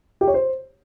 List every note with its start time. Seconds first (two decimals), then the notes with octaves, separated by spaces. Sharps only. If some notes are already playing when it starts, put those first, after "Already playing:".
0.21 G4
0.28 C#5
0.34 C5